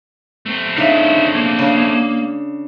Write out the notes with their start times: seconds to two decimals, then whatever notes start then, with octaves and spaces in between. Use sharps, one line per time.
0.46 A3 C4
0.78 C#3 D4 D#4 E5
1.36 A#3
1.59 C#3 D4